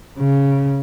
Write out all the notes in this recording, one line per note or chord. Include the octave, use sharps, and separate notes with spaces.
C#3